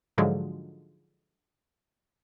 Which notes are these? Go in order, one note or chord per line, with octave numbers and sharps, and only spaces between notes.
G#2 D3 F3 F#3 G#3